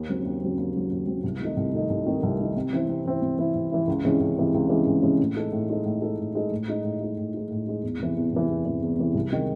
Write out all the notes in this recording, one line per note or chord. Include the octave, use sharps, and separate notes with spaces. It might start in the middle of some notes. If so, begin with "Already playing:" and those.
Already playing: D#2
C#3 F#3 C4
D#2
C#3 F#3 C4
D#2
C#3 F#3 C4
D#2
C#3 F#3 C4
C2
C3 D#3 A3 D#4
C2
C3 D#3 A3 D#4
C2
C3 D#3 A3 D#4
C2
C3 D#3 A3 D#4
C3
E3 C4 E4
C3
E3 C4 E4
C3
E3 C4 E4
C3
E3 C4 E4
C#2
C3 E3 G#3 C#4
C#2
C3 E3 G#3 C#4
C#2
C3 E3 G#3 C#4
C#2
C3 E3 G#3 C#4
A2
G#3 D#4 A4
A2
G#3 D#4 A4
A2
G#3 D#4 A4
A2
G#3 D#4 A4
A2
G#3 D#4
A2
G#3 D#4
A2
G#3 D#4
A2
G#3 D#4
E2
C3 E3
E2
C3 E3
E2
C3 E3
E2
C3 E3
C2
C3 D#3 G#3